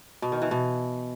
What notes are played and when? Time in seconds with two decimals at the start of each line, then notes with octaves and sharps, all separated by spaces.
0.22 B2
0.32 D#3
0.42 E3
0.51 B2